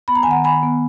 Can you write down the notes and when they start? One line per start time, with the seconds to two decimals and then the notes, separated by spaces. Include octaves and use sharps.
0.08 B3 B5
0.15 A#5
0.23 G#5
0.26 D#3 F#5 A#5
0.44 D#3 G#5 B5
0.63 B3